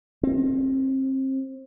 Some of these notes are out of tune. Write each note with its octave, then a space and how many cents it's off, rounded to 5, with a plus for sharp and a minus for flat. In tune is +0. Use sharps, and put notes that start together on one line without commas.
C4 +30